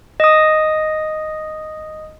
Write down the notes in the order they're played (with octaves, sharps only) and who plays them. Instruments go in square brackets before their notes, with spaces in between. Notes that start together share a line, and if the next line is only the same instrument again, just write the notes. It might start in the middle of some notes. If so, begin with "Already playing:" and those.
[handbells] D#5 D#6